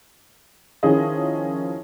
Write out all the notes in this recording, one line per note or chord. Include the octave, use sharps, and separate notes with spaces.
D#3 F3 C#4 E4 G#4 D#5